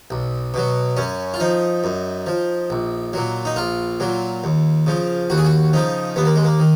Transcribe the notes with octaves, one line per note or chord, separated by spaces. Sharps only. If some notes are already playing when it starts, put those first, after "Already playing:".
B1
B2 F#3
F#2 C#4
F4
F3 D#4
F#2
F3
A#1
A#2 F#3
D#4
A#1 F4
A#2 F#3
D#2
C#3 F3
D#2 F#4
G#4
F#4
C#3 F3 D#4
D#2 B3
A#3
G#3
A#3
D#3